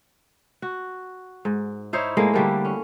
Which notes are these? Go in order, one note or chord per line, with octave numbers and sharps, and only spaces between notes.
F#4
G#2
D#4 E4 C5 C#5
A2 G#3 A#3
D3 G3 A3 A#3
C#4